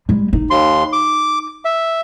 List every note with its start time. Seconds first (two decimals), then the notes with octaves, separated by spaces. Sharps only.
0.09 G3 G#3
0.33 D#4
0.50 D#2 C6
0.93 D6
1.65 E5